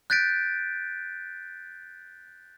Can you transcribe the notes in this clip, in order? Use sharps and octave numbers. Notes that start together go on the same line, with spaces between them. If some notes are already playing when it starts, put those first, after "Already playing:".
F#6 G6 A6 B6 D7